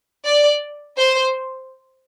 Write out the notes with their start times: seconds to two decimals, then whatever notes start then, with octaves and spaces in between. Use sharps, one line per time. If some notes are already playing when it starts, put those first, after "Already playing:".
0.25 D5
0.97 C5